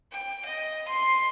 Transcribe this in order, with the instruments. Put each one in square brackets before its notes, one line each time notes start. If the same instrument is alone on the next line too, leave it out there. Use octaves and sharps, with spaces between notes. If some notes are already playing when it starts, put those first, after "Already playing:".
[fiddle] G5
D#5
C6